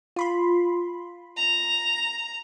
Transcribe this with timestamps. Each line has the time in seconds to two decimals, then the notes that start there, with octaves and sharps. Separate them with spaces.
0.16 F4 B5 C6
1.37 A#5